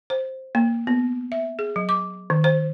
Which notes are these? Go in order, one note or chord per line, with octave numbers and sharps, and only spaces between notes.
C5
A#3
B3
E5
G#4
F#3
D6
D#3
C5